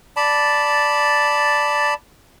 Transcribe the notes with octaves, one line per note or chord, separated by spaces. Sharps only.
D5 A5 B5